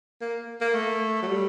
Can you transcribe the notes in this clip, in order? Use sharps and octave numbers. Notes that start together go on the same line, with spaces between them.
A#3
A#3
A3
F#3
G3